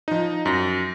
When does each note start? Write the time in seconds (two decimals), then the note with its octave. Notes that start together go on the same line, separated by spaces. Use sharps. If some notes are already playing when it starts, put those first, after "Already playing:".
0.08 F3 D#4
0.46 F#2 A#6